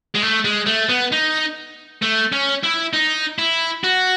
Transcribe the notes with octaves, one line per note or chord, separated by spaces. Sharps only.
G#3
A3
G#3
A3
B3
D#4
A3
C#4
E4
D#4
E4
F#4